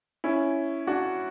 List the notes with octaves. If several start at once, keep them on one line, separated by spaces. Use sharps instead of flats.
C#4 E4
D4 F#4